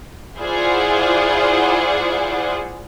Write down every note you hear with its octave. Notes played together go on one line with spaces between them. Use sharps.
E4 F4 G#4 C5 D5 F#5